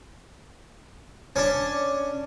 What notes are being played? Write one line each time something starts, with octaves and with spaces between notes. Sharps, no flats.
C#4 D4